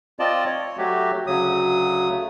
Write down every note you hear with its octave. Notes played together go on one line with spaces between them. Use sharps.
C4 F4 D5 D#5 A5
C#5
F#3 A3 F#4 G4
D2 C#3 F#3 D#6
A3